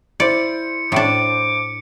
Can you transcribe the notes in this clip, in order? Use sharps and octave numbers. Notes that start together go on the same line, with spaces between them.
E4 C5 D5 C#7
A2 D4 D6